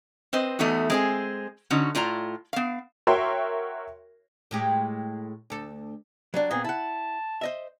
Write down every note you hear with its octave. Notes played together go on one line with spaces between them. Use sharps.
C4 B4 C5 D#5
E2 A3 B3 D#4 F#4
G#3 C4 G#4
D3 C#4 D#4 F#4
A2 F4 D5 A#5
B3 F5
F#4 A#4 C#5 E5 G5 C6
A2 G#3 G4
D2 A4
F#3 G3 D4
A#2 B3 C4 G#4
E4 F#5 A5
C5 D#5 E5